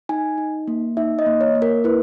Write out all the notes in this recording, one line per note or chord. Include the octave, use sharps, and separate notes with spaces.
D#4 G#5
D#4
A#3
D#4 E5
D#5
A#3
C#5
A#3
A#4
E4 B4